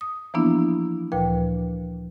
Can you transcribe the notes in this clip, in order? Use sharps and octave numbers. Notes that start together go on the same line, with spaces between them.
D#6
E3 F3 A#3 B3 D4 E4
D2 A#2 F3 B4 G5